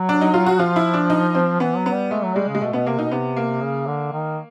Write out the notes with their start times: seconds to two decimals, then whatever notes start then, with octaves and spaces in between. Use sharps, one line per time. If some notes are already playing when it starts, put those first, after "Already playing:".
Already playing: F#3
0.09 D4
0.21 D#4
0.34 F4
0.46 F#4
0.59 F3 F4
0.76 E4
0.94 D4
1.10 D#4
1.35 C4
1.60 E3 B3
1.77 F#3
1.86 B3
1.93 G3
2.11 G#3 A3
2.24 F#3
2.35 G3 G#3
2.49 C#3
2.55 G#3
2.61 B2 A3
2.73 B2 B3
2.86 C3 A#3
2.99 B2 D#4
3.12 C3 B3
3.37 A#3
3.61 C#3
3.87 D3
4.12 D#3